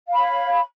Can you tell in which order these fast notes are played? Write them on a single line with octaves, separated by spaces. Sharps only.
F5 B5 C#5